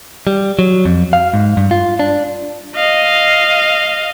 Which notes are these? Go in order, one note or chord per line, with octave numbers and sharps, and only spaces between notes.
G3
F#3
F2
F5
G#2
G2
F4
D4
D#5 F5